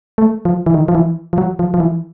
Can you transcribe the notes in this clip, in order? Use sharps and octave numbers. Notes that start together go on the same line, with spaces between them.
A3
F3
E3
D#3
F3
E3
F3
F#3
F3
F3
E3